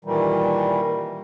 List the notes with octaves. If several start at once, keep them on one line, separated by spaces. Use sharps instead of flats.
A#2 D#3 E3 G3